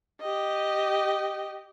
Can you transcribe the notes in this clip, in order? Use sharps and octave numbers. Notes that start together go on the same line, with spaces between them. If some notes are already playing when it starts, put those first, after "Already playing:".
G4 D#5